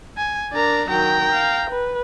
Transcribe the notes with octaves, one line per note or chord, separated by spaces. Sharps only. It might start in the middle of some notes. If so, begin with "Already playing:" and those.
G#5
D4 A#4 D5 A#5
D#3 F#3 G5 A#5
F5
B4